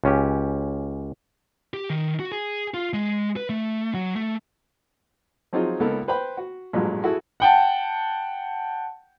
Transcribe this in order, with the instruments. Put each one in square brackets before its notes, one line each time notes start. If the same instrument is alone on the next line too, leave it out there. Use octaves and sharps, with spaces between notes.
[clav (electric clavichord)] C#2 C#4 G4
[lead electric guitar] G4
D#3
F#4
G#4
F4
G#3
B4
A3
F#3
A3
[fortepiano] F3 F#3 C4 D#4 F4 G#4
C#2 A#3 B3 D#4 A4 A#4
B4 C5 G5 B5
F#4
A1 G2 A#2 F3 F#3 G#3
E4 F#4 G#4 A4
[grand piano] F#5 G5 A5